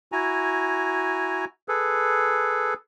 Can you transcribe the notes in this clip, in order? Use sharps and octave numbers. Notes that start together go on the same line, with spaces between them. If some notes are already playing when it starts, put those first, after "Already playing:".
E4 F#4 G#5 A#5
G#4 A4 B4